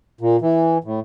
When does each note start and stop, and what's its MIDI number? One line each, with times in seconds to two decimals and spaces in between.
0.21 0.37 46
0.41 0.78 52
0.84 1.00 45